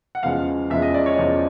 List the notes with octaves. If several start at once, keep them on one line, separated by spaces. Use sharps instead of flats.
F#5
E2 C#3 F3 G#3 F5
E2 C#3 F3 G#3 E5
D#5
D5
C#5
E2 C#3 F3 G#3